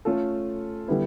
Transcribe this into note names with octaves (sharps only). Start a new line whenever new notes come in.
A3 C#4 F4 A4
D3 G3 B3 E4